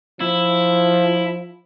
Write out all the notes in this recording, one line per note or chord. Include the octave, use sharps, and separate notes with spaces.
F3 E4